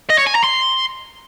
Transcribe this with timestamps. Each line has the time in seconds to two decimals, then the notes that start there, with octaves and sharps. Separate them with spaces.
0.10 D#5
0.18 C#5
0.26 G#5
0.35 A#5
0.43 C6